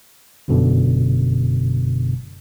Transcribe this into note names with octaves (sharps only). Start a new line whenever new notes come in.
G1 F#2 B2 D3